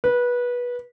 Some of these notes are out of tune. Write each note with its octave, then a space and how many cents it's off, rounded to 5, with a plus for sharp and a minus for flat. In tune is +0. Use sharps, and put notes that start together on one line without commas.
B4 -20